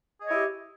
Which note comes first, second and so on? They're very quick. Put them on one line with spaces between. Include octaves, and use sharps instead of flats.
G#4 D#5 C#5 E4 G4